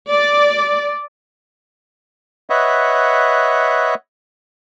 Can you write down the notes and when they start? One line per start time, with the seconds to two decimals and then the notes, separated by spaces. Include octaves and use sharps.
0.12 D5
2.50 B4 C#5 D#5 E5 F#5